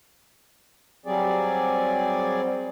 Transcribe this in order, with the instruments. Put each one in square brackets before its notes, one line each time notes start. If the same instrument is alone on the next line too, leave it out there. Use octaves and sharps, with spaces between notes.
[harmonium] F#3 G3 C4 G#4 D5